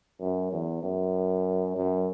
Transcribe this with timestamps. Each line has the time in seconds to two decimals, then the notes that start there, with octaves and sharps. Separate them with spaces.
0.21 F#2
0.52 E2
0.83 F#2
1.76 F#2